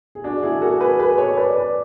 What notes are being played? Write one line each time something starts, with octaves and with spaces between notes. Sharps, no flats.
G#4
D4 F#4
E4 G#4
F#4 A4
G#4 B4
G#4 B4
A4 C#5
B4 D5
B4 D5